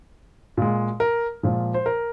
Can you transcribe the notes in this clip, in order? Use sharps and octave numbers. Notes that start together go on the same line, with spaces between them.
A#2 G#3
A#4
A#2 F3 G#3
C5
A#4